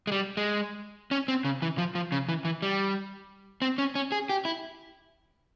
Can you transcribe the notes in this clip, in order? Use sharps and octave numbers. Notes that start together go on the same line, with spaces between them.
G#3
G3
G#3
C#4
C4
C#3
E3
F3
F3
C#3
E3
E3
G3
C4
C#4
C#4
G#4
G4
E4